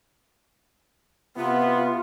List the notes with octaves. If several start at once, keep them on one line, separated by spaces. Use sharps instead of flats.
C3 B3 F4